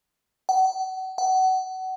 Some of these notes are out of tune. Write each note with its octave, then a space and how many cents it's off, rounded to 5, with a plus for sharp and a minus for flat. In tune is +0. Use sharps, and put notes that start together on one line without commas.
F#5 +35
F#5 +25